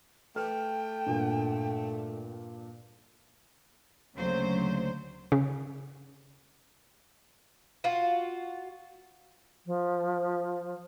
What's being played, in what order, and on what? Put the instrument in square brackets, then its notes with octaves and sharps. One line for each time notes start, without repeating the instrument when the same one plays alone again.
[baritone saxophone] A3 [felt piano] B4 F6 [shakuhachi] G5
[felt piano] G2 A#2
[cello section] D2 C#3 F#3 A#3 C5
[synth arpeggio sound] C#3
[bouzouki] F4 F#4
[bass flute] F3